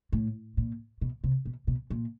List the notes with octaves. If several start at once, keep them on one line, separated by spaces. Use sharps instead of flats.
A2
A#2
B2
C3
B2
B2
A#2